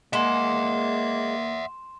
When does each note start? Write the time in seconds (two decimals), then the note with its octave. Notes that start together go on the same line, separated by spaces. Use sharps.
0.13 G#3 A#3 E5 F#5 C6 E7